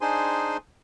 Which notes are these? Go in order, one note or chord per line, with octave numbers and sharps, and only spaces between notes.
D4 D#4 G#4 C5 G#5 C6